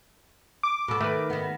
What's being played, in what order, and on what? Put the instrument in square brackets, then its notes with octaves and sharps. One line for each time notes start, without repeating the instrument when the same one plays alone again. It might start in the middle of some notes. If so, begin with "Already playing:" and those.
[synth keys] D6
[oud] B2 A4
[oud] D#3 [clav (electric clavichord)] A3 B4
[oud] D#3 B3